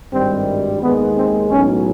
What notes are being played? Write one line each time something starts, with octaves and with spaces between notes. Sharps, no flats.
G#1 G2 D#3 G3 C4
D#2 D#3 G#3 B3
C4
B1 A2 F#3 C#4